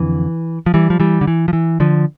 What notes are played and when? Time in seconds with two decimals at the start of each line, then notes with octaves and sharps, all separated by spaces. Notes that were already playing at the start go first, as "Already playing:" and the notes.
Already playing: F2 D3 E3
0.66 F3
0.74 E3 G3
0.90 F3
1.00 E3 G3
1.21 D3
1.27 E3
1.48 F3
1.53 E3
1.80 D3 F3